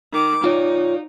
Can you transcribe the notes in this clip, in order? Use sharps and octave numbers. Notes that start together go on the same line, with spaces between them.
D#3 D6
D#4 F4 C#5 D5